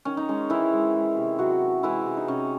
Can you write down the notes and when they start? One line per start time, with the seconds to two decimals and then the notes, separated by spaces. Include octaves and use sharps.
0.05 D#3 C#4
0.17 D#4
0.29 G#3 C#4
0.50 D#3 E3 E4
0.73 G#3
0.95 G#3
1.17 C3
1.39 C3 F#3 F#4
1.61 E3
1.83 E3 G#3 E4
2.06 C3
2.17 D#4
2.28 C3 C#4